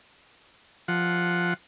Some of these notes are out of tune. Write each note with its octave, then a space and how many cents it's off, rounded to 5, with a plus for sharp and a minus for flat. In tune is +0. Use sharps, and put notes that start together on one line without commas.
F3 +0 F#5 +0